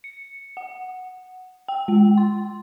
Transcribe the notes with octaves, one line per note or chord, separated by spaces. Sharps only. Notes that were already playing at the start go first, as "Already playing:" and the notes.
C#7
F#5
G5
G#3
C6